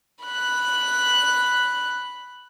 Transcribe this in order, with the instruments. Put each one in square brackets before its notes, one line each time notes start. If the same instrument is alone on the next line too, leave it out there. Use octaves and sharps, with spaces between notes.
[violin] B5 F#6